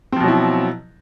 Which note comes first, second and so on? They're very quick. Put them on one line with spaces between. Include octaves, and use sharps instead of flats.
C4 F3 B2 F#3 E4